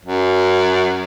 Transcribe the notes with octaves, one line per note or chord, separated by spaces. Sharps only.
F#2